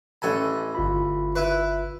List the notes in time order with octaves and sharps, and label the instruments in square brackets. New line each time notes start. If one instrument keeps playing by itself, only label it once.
[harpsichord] A1 A4 G#5 [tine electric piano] D#5 B5
[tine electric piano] G1 F4 B5
[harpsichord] E4 B4